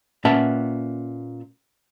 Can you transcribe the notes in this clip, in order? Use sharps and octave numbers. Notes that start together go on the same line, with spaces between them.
A#2 C#4 B4 E5 F#5 A5